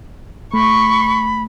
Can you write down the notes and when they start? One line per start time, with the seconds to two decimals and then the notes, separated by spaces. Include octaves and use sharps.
0.54 A3 B5 C#6